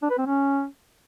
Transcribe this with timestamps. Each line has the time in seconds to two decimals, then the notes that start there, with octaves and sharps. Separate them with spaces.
0.02 D4
0.10 B4
0.18 C4
0.26 C#4